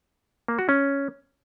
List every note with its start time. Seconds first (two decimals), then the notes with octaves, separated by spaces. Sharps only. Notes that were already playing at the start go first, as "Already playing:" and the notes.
0.48 A#3
0.59 F#4
0.69 C#4